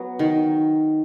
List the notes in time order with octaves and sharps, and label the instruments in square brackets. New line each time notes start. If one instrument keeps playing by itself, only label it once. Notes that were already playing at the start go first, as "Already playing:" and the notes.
Already playing: [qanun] F#3 B3
D#3